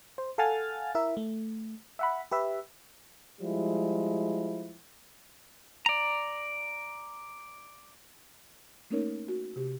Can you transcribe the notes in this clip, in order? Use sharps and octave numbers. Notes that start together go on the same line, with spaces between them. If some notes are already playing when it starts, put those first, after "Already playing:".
C5
A4 F5 F#5 G#5 F6 A6
E4 A#4 E5
A3
E5 F#5 B5
G4 B4 E5
F3 G3 G#3 E4
D5 A#5
A3 A#3 C#4 D#4 A#4 C#5
F#4
C3 G4